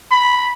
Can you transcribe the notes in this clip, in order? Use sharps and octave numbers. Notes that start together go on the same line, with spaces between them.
B5